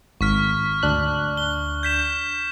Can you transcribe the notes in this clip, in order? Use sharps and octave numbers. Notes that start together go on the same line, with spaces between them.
G#1 C#6 F6 B6
D2 D4 F#6
G7
G6 B6 E7